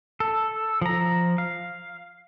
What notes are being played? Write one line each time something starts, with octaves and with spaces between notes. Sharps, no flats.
A4
F3 A#5
F5